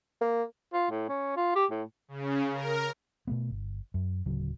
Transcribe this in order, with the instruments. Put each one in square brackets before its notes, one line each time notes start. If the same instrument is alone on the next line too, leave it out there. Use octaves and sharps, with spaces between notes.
[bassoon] A#3
[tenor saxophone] F4
A2
C#4
F4
G4
A2
[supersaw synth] C#3
A#4
[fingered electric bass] B2 A3 B3
G1
F#2
D1 C#3 F#3